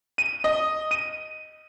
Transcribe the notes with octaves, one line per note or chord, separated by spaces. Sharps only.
D#7
D#5
D#7